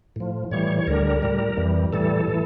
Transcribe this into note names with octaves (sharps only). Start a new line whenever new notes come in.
A2 F3
A2 E3 G3 C#5
C#5
D2 D3 G3 A#4
A2 G3
F2 E3 G3
A2 E3 G3 A4
A2 E3